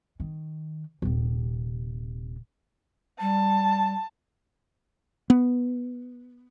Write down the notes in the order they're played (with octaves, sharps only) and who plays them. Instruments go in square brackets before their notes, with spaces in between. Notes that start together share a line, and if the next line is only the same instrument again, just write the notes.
[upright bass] D#3
D#1 C3
[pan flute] G3 [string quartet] A5
[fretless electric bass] B3